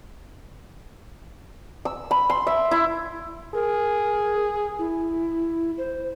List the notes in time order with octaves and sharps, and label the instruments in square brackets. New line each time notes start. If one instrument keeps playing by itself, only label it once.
[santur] E6
B5
C6
E5
E4
[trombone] G#4 [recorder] A#4
[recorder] E4
C5